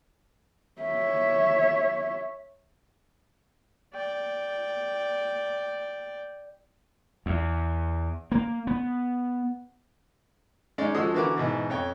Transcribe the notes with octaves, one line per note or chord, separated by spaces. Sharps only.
C#5 E5
D5 G5
E2
A#3
B3
G#3 C#4 D#4 D5
F3 G#3 F#4 A4 D#5 D#6
D3 E3 B3 F#4 A#4 D6
G#2 B2 E3
F2 C#5 G5